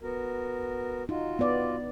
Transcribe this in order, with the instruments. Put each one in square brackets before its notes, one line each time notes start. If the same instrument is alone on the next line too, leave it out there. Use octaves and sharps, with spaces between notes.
[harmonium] B3 F#4 A#4
[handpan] D#4 [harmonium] F4 F#4
[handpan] B3 D5